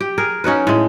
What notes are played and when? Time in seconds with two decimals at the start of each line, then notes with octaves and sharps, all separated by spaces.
0.01 G4
0.18 G#4 A#4
0.44 C#4 D#4 F#4 B4
0.67 A2 G#3